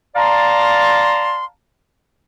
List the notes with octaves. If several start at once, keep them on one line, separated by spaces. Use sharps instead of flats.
D5 F5 A5 A#5 C6